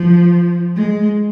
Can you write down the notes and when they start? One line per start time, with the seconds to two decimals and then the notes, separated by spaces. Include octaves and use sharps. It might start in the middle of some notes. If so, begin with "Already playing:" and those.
Already playing: F3
0.76 G#3